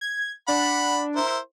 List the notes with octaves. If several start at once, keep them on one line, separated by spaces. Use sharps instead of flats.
G#6
D4 F#5 B5
E4 A#4 C5